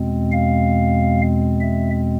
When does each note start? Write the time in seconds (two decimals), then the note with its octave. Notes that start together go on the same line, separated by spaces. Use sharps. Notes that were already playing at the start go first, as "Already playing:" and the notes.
Already playing: E2 B2 G#3 C4
0.32 F5
1.60 E5